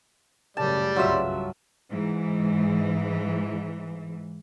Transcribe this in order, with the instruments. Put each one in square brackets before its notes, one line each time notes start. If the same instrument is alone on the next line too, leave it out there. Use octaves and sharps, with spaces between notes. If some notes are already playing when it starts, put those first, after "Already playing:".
[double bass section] F#2 A2 C#3 [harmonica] G3 D5 [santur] A5
[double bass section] C2 G2 C#3 [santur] F#3 F4 E5
[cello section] G#2 E3